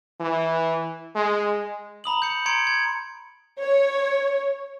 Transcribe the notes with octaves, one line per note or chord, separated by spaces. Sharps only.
E3
G#3
A#5 B5 D#6 F#7
G6 C#7
A#5 C6 G#6 C#7 D7
G#6
C#5